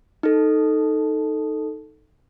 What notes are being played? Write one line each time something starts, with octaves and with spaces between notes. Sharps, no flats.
D#4 A4